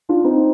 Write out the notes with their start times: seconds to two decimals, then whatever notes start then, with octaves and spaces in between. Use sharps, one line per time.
0.09 D4 F4
0.24 C4 D#4